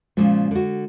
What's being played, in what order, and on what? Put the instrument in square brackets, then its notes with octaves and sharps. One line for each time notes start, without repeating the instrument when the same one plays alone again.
[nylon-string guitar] A#2 C#3 F3 [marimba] G#3
[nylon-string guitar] D3 F#4